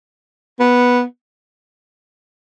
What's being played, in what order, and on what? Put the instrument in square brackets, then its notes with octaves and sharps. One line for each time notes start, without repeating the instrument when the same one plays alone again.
[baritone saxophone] B3